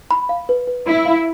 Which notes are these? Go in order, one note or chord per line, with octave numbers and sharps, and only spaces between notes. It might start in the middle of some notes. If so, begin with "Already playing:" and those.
B5
F5
B4
B4
E4 B5
F5